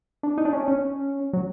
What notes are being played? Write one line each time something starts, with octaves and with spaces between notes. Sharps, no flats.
D4
D#4
D4
C#4
C#4
F#3